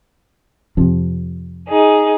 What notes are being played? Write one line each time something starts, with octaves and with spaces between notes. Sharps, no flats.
F2 C3
D#4 G#4